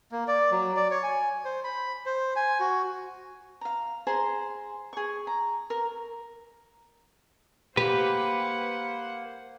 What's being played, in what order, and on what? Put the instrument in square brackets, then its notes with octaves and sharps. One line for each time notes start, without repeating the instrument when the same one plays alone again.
[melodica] A#3
D5
F#3
D5
C#5
G#5
C5
B5
C5
G#5
F#4
[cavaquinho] F5 A#5
G#4 C5 A#5 C6
G#4 C#6
A#5
A#4
[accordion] A#3 [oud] G4 [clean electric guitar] B4 [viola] C5 F#5